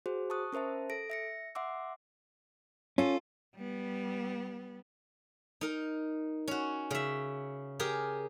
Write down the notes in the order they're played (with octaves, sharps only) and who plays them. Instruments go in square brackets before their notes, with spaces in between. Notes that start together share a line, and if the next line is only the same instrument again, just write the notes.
[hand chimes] F#4 G#4 C5
A5 C#6 D#6 F#6
C#4 A#4 C5 E5 A5
A4 A#6 D7
E5 A#6 C#7
E5 F#5 C6 D6 E6
[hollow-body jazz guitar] C#4 [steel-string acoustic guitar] F4 A4
[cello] G3 B3
[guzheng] D#4 A#4
C#4 F#4
C#3 E5
G4 G#4 A#4